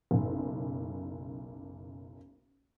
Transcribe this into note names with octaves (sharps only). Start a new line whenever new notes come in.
F#1 B1